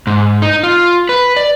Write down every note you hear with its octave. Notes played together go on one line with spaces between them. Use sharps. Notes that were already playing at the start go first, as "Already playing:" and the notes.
G#2
D#4
F4
B4
D5